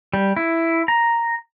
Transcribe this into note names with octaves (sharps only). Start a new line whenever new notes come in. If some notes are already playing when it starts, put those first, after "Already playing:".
G3
E4
A#5